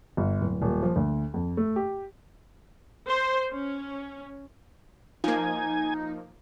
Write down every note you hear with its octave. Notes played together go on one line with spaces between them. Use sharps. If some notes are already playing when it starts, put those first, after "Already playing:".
G1
D1
D#1
F3
D2
F2
A3
G4
C5
C#4
F3 A#3 D#4 G#5